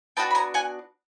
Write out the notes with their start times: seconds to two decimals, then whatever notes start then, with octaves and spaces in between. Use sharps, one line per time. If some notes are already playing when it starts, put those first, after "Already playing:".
0.17 B3 D4 F#4 G5 A5
0.31 B5
0.35 G#5 A#5
0.54 F#5 G#5